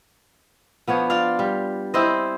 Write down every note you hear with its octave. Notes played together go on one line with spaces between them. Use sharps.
F3 B3 D4 C#5
F4 D5 F5
G3
C4 E4 C5 D#5